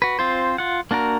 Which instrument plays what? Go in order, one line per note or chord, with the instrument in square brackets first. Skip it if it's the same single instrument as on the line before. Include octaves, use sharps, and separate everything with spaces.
[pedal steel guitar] F#4 B4
C4 F4 C5
F4 F#5
A#3 D4 F#4 A#4